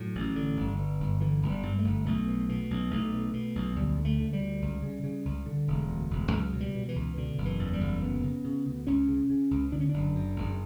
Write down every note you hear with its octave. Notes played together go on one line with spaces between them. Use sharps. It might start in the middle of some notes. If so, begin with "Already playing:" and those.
Already playing: A2 F#3
A1
D3
G1
G2
G1
D3 E3
G1
G3
G2
A3
G1
B1 A3
B2
B2
B1
B1 A3
B2
B2
B1
D2 G3
D3
A3
D3
G3
D2
C#2
C#3
C#3
C#2
D3
E1
D2
E1
C#2 F#3
B2
G3
B2
E3
C#2
B2 D3
F#1
E3
E2
G3
F#1
D2 B3
C#3
C#3
D2
C#2 C#4
C#3
C#3
C#2
D3 D4
C#4
F#1 D4
F#2
F#1